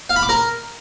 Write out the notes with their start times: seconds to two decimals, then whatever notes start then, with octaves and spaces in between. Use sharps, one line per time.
0.09 F5
0.16 B5
0.23 D6
0.29 A#4